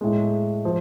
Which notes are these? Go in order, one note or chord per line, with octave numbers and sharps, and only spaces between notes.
A2 G#3
F3